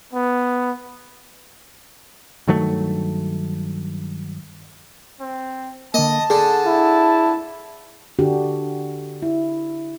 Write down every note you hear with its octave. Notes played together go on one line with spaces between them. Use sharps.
B3
G2 D#3 F#3 A3
C4
D3 A#3 D#5 A5
D3 G#4
E4
D3 D4 F#4 G4
E4